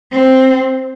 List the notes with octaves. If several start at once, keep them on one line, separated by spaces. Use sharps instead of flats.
C4